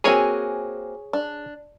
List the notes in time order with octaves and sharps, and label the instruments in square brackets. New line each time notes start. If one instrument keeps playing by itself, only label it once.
[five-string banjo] A#3 C4 F#4 [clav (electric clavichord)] G#4 C#5 G#5
[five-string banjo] D4